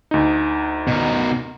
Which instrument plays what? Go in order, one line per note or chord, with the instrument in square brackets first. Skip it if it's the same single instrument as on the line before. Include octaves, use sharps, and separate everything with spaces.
[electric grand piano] D2 D#4
[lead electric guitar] B2 A#4